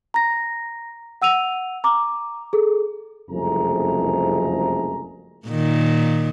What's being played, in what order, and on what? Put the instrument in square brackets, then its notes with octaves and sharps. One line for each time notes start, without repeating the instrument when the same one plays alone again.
[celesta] A#5 A#6
F#5 E6 D#7 F7
A#5 D6
G#4 A4
[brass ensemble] F#1 C2 F2 A3 G#4 A#5
[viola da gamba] A#2 D#3